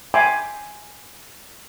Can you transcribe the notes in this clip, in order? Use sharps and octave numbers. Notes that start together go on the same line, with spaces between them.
E5 G5 G#5 B5 C6 D6